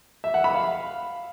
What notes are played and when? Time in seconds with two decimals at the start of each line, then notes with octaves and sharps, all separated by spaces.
0.24 E5
0.34 F#5
0.44 B5
0.54 F5